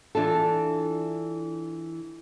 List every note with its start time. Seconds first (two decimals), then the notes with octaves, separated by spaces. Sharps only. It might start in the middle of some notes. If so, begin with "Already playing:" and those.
0.15 E3 D4 F4 A4